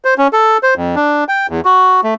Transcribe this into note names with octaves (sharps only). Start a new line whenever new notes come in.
C5
C#4
A4
C5
F2
D4
G5
E2
F#4
A3